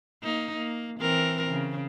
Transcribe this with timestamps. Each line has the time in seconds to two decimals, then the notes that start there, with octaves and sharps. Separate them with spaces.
0.23 A#3 D#4
0.57 A#3
1.00 E3 C4 A#4
1.50 C#3